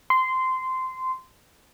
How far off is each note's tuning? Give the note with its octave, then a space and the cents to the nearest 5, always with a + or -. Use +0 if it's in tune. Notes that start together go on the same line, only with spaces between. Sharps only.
C6 -15